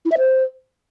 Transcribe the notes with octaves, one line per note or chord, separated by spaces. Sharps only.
E4
E5
C5